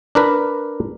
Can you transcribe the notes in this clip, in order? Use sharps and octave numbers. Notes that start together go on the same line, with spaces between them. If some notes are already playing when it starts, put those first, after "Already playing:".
D4 A#4 B4